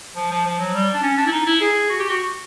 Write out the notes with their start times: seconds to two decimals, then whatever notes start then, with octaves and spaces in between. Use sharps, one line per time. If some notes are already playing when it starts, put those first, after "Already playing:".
0.16 F3
0.31 F3
0.45 F3
0.59 F#3
0.74 G3
0.94 D4
1.03 C#4
1.18 D4
1.27 E4
1.32 D#4
1.46 E4
1.61 G#4
1.90 F#4
2.00 G4
2.09 F#4